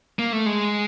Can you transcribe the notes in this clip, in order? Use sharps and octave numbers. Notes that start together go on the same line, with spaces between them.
A#3
A3
G#3